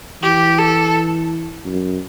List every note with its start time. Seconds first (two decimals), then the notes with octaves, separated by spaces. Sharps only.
0.22 E3 G4
0.58 A4
1.65 F#2